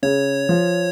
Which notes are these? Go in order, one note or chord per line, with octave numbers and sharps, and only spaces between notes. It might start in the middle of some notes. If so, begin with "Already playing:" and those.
C#3 C#5
F3